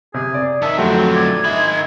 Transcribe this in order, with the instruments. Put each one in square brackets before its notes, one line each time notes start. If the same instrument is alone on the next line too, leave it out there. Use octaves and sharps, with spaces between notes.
[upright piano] C3 [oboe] G#4
[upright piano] D5
[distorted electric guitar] D#3 [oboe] E5 [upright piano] A5
[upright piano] F2 A3 [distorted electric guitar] D3 F#3 [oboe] C4
[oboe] D5 [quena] G#6
[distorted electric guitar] D#3 B5 [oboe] G#4 [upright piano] E5